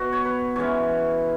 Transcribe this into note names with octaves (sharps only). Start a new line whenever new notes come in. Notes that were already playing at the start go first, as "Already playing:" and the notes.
Already playing: B2 B3 F#4
C#5
B4
E3 G#3 C#4 C#5